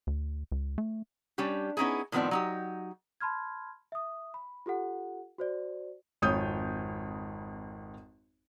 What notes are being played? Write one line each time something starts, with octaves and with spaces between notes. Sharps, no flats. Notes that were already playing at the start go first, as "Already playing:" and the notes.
D2
C#2
A3
G3 C#4 D4 G4
B3 C#4 D#4 E4 G#4
A2 D#3 F3 B3 C4 D5
F#3 D#4 G4
A5 B5 C6 F6 G#6
E5 D#6
B5
F4 G4 A4 F#5
F#4 C5 D5
G#1 F2 C#5 D#6 G6